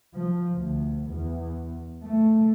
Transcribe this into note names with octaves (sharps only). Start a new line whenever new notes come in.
F3
D2
E2
A3